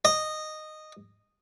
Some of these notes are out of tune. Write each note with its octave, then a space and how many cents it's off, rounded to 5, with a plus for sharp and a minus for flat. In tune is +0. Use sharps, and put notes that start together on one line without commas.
D#5 -10